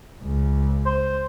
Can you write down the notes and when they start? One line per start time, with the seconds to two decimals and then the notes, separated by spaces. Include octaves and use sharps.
0.22 C#2
0.86 C5